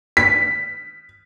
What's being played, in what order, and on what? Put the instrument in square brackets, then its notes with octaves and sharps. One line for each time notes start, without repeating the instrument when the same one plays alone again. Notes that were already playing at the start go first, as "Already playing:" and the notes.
[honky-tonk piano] B6